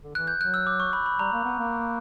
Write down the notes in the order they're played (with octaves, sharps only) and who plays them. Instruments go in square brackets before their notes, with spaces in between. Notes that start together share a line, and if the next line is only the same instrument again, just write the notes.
[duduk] D3
[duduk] E3 [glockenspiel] F#6
[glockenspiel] G6
[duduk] F#3 [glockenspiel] F#6
[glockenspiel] E6
D6
C#6
B5
B5
[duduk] G3 [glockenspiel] A#5
[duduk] A#3
B3
A#3